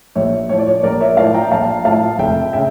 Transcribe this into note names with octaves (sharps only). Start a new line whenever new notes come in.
A#1 C#5 E5
A2 F3 C#5
D5
C#5
A#1 A#4 D5
C#5 E5
A2 F3 D5 F5
G5 A#5
A#1 F5 A5
A2 F3 F5 A5
F1 E5 G5
C#3 E5 G5